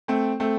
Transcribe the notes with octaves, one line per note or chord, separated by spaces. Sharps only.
A3 C4
A3 C4